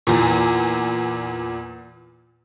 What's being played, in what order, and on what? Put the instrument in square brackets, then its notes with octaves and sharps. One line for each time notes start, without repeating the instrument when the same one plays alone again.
[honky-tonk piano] E2 A#2